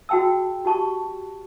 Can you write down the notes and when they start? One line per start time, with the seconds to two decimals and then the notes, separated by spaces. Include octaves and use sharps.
0.09 F#4 G#4 G5 A5 E6
0.65 F#4 G4 A5 C#6